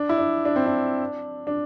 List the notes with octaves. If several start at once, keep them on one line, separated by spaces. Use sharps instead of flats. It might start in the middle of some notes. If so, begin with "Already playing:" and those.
Already playing: D4
E4
D4
D4
C4
D4
D4